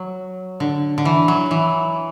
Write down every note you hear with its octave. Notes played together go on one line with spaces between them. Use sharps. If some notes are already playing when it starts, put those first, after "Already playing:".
Already playing: F#3
D3
D3
E3
F#3
E3